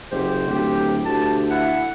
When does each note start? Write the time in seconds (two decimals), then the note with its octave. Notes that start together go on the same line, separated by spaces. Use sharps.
0.11 F#1 G4 C5
0.47 D1 G4
1.05 D2 G4 A5
1.51 E4 F#5